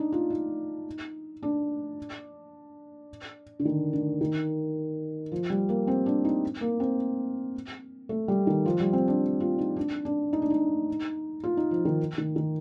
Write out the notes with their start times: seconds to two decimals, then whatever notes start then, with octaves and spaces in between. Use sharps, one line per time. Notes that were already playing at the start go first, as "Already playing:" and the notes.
Already playing: D4 D#4
0.12 F4
0.30 D#4
1.43 D4
3.59 D3
3.65 D#3
3.93 D3
4.21 D#3
5.32 F3
5.50 G3
5.69 A#3
5.87 C4
6.06 D4
6.25 D#4
6.61 A#3
6.80 C4
8.09 A3
8.28 G3
8.47 D#3
8.66 F3
8.80 G3
8.93 C4
9.08 D4
9.40 F4
9.59 D#4
9.76 D4
10.05 D4
10.33 D#4
10.42 D4
10.50 D#4
11.44 F4
11.57 D#4
11.71 F3
11.85 D#3
12.18 D#3
12.36 D#3